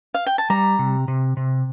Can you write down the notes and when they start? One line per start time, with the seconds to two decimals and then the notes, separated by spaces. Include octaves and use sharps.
0.14 F5
0.26 G5
0.38 A5
0.50 G3 A#5
0.79 C3
1.08 C3
1.37 C3